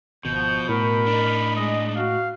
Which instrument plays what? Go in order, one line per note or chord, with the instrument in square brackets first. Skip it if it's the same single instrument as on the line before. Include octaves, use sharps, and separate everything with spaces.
[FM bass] G#1 [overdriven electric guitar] B2 [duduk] F3 [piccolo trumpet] G6
[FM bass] A2 [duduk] A#4 [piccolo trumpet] B5
[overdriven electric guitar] D4 D#4
[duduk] G#3 [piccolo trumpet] D#5
[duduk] F#4 [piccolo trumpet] F5